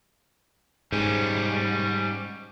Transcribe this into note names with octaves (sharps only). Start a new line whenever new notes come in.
G#2 G3 C#4